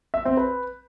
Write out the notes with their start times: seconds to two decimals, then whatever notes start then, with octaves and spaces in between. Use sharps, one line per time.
0.14 E5
0.25 C4
0.37 B4